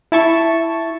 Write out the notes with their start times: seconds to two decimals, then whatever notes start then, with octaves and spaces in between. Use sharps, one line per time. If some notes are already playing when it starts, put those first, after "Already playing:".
0.12 E4 A5 C#6